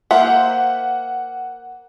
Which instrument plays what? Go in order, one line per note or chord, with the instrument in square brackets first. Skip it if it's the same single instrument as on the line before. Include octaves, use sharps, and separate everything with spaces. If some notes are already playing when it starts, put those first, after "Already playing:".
[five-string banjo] A#3 C5 E5 [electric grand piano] F#5